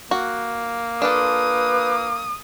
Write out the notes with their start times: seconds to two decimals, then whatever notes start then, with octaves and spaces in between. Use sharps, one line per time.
0.11 A#3 F#4
1.02 D4 F4 A4 B4 D#6